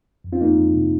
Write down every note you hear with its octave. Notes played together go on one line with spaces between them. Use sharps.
F2
C4 F4
F2 A#3 D#4
F2
C3